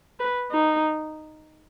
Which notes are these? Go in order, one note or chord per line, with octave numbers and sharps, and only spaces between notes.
B4
D#4